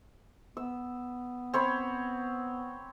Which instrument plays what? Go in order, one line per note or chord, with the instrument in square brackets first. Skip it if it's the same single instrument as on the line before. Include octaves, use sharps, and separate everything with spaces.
[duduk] B3 [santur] E6
[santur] C4 C#5 B5